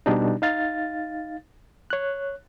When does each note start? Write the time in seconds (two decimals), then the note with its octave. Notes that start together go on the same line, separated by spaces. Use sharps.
0.06 B2 G3 D4 D#4
0.42 D#4 F5 A6
1.90 C#5 F#6